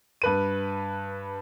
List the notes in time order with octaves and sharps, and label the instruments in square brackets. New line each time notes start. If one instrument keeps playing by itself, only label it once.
[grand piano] G2 B4 D#7